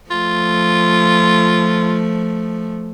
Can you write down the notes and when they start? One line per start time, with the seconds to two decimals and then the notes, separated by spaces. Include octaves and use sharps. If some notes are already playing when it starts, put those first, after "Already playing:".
0.11 F3 A3 F4